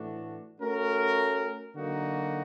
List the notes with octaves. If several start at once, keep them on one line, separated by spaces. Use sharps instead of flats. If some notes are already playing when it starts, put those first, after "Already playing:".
Already playing: A2 E3 A3 D4 F#4
A3 C#4 F#4 A#4
D3 F#3 A#3 D#4 F#4